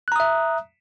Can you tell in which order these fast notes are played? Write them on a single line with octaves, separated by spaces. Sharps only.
F#6 A#5 D#6 E5